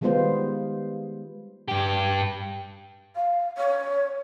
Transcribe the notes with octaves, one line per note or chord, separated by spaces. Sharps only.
D#3 G3 G#3 B3 F4 C5
G2 G4
F5
C#5